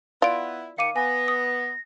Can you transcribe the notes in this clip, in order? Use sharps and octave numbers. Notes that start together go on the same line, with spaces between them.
B3 E4 F4 D5 D7
D#3 F5 D6 C#7 D#7
B3 G#5 A#6
D#6